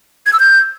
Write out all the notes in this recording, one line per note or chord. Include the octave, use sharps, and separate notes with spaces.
G#6
E6
G6